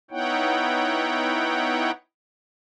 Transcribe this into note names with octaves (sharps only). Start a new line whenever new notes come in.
B3 D#4 E4 C#5 F#5 G5